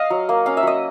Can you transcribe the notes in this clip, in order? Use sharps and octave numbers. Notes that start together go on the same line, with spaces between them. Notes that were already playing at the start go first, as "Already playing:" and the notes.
Already playing: D#5 F5
F#3
A#3
C#4 F5
E5
F#3 D#5